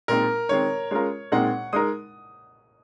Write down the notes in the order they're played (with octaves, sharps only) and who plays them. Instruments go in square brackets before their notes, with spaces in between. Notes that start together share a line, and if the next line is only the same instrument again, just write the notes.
[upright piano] A#2 G#3 C4 D#4 [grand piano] A#4
[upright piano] D#3 G#3 C4 [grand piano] C#5
[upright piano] G#3 C#4 F4 A#4
[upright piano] A#2 G#3 C4 D#4 A#4 [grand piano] F#5
[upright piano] G#3 D#4 A#4 [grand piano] D#6